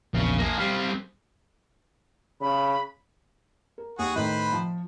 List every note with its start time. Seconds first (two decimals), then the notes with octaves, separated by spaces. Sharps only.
0.14 A#1 E2 C#3
0.38 A#3 G#4
0.58 G3 C4 F5
2.41 C#3 B5
3.78 A#4
3.99 D#2 F#4 G#4
4.16 A2 D#3 B4 C5 B5
4.52 F3